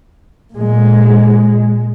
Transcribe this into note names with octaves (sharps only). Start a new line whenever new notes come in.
A#2 G#3